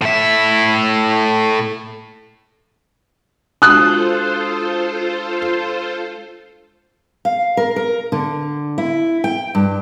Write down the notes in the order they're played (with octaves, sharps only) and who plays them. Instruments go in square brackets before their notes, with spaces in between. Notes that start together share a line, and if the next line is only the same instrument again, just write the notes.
[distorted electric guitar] A2 E5
[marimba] G#3 D4 F#4 [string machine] F4 A4 C5 [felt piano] D#6 F#6
[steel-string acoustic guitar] F5
A#4
A#4
D3
E4
G5
G2